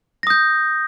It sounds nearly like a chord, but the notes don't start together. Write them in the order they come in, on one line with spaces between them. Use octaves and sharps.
A#6 D#6 G6